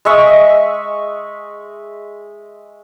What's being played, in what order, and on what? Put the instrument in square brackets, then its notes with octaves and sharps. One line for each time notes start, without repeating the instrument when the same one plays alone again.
[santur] G#3 D#5 E5 C#6